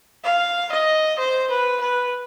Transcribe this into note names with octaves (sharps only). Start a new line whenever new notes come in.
F5
D#5
C5
B4
B4